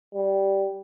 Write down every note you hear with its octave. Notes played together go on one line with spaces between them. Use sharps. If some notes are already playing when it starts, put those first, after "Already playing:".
G3